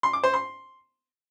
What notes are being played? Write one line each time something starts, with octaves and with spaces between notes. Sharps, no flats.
C6
D6
C5
C6